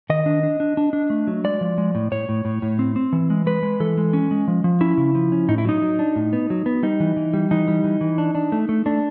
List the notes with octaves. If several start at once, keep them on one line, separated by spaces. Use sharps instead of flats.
D#3 D#5
D4
D4
D4
D4
D4
A3
F#3
G#3 D5
F3
G#3
A2
A2 C#5
A2
A2
A2
C4
C4
E3
G#3
G#3 B4
G#3
E3 A4
G#3
C#4
G#3
F3
F3
C#4 E4
C#3
F3
C#4
A2 D#4
E4
F#3 D#4
F#3
D4
A2
B3
F#3
B3
G3 D#4
E3
E3
G3
E3 D#4
G3
E3
E3
D4
D4
A3
A3
A3 D4